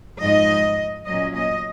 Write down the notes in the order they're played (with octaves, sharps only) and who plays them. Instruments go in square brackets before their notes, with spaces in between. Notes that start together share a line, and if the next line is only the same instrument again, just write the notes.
[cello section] G#2 F3 G#3 D#4 D#5
A#2 F#3 C#4 D#5
D#5